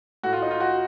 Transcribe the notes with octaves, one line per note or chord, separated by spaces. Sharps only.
A2 F#4
F4
D#4
F4
F#4